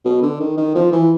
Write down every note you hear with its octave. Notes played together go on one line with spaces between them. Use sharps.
B2
D3
D#3
D#3
F3
E3